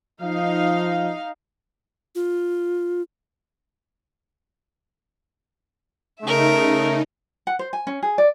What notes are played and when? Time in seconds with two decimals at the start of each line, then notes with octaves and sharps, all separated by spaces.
0.21 F3 D#4 F5
2.15 F4
6.22 C#3 A3 D#4 A#4 E5
7.47 F#5
7.59 C5
7.73 G#5
7.87 C#4
8.03 G#4
8.18 D5